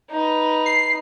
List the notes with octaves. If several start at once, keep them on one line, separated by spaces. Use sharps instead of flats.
D#4 B4
C7